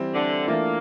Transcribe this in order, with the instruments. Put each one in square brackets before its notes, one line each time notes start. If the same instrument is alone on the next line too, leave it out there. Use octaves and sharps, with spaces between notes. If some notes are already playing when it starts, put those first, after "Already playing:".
Already playing: [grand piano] E3 G3 C4
[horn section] D3
[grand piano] E3 A3 D4 F4 [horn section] A#3